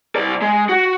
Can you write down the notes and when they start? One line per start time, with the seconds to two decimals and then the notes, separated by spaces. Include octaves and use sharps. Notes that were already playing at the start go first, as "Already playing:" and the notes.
0.16 C2 D5
0.42 G#3
0.69 F#4